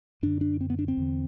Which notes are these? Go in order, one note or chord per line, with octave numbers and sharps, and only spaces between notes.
F#2 D3 D4
D4
C4
B3
D4
C4
E2 D3